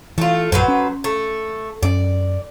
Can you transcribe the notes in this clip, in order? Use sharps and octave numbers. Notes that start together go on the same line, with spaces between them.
E3 A3 F4
A#1 F#2 F#3 B4 C5
C#4
A3
F#2 C#4 D5